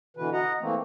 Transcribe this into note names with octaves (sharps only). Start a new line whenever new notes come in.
B2 D3 E3 B4
D#5 F#5 A#5
E3 A3 A#3 C4